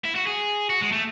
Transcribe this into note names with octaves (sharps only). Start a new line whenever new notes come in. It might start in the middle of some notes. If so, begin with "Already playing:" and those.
E4
F#4
G#4
F#4
G#3
A3